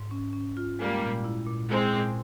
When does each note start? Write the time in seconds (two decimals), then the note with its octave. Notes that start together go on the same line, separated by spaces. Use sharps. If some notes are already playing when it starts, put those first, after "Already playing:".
Already playing: G#2
0.11 C#4
0.33 C#4
0.57 F4
0.79 G3 G#3 A#3
1.02 A#2
1.24 E4
1.47 A#2
1.69 G#3 C4 E4
1.93 A#2